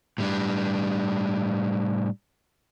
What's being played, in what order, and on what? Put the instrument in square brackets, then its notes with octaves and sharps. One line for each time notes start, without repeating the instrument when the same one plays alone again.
[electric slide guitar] A2 G3 D4